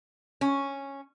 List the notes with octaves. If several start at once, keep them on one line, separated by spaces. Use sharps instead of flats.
C#4